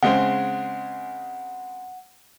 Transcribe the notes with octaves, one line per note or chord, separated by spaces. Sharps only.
C#3 G#3 C4 F#5